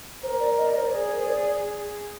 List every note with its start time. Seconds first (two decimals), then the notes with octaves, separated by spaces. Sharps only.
0.23 A#4 C5
0.40 D5
0.58 D#5
0.67 D5
0.77 C5
0.87 G#4 D5
1.12 A#4
1.20 C5
1.26 D5